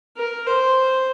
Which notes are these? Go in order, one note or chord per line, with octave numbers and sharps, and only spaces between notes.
A#4
C5